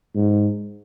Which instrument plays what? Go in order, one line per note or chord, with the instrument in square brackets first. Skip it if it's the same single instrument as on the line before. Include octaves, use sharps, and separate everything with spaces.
[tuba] G#2